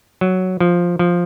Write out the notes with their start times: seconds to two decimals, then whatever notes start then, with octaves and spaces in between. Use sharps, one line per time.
0.21 F#3
0.60 F3
0.99 F3